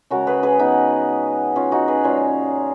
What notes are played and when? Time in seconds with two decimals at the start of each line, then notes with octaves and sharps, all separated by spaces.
0.10 C#3 G#3 F#4 A#4
0.27 G#4 B4
0.43 G#4 B4
0.59 B3 D#4
1.56 C#4 F4
1.72 D#4 F#4
1.88 G#4 B4
2.04 A#2 F3 G#3 C#4 F4